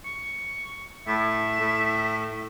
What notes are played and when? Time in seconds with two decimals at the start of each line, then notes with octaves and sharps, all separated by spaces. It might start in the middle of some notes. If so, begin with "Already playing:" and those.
0.05 C#6
1.07 A2 E5
1.60 A2